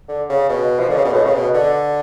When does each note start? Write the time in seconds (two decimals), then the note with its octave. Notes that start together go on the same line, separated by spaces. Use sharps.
0.08 D3
0.29 C#3
0.49 B2
0.80 F3
0.88 D3
0.96 C#3
1.04 B2
1.13 A2
1.24 C#3
1.34 B2
1.54 D3